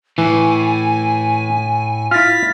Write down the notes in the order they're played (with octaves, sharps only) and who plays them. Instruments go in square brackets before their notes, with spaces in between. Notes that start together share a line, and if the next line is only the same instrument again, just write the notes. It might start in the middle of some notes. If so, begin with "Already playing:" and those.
[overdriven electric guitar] A2 [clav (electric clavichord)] E3 [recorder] G#5
[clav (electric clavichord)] E4 F4 [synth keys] F6 A6 [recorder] B6